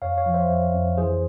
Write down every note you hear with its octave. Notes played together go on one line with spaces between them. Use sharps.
F2 C#5 F5
C#5 F5
F3
C5 E5
F2
F2
E3 G#4 C5